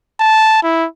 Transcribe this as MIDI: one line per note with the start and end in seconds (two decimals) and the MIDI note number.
0.20 0.60 81
0.64 0.86 64